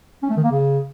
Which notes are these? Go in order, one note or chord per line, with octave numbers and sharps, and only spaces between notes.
C#4
A3
D#3
A#3
C#3